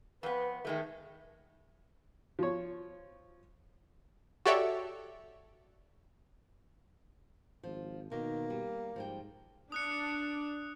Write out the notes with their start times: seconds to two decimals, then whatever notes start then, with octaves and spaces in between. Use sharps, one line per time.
0.23 F2 B3 B4
0.65 D#3 G#3 A3 E5
2.39 F3 C#5
4.46 F#4 G4 A4 C#5 D5 E5
7.63 G#1 F3
8.12 B2 D#3 A#3
8.50 G3
8.96 G#2 F3 G3 G5
9.72 D4 D#6 F#6 C#7